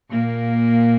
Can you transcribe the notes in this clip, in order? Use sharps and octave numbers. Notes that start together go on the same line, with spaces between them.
A#2 A#3